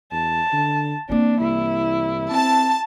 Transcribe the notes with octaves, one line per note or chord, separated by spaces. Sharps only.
E2 A5
D3
E3 A#3 C4 D4
C2 E4
C4 A5